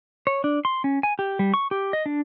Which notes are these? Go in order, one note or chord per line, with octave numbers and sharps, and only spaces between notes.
C#5
D4
C6
C#4
G#5
G4
G3
C#6
G4
D#5
D4